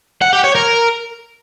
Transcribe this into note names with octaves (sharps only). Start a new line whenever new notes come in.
F#5
G4
C#5
A#4